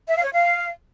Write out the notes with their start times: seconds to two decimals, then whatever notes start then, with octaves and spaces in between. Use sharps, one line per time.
0.08 E5
0.16 F5
0.24 C#5
0.32 F5